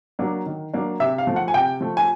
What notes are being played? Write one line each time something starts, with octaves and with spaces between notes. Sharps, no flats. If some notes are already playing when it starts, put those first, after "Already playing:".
F#3 A#3 D4
D#3
F#3 A#3 D4
C3 E5
F5
F3 A3
F#5
G#5
C3 G5
F3 A3
G#5